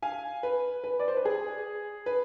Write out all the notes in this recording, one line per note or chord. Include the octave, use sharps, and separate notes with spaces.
F5 G#5
B4
B4
D5
C5
B4
G#4
B4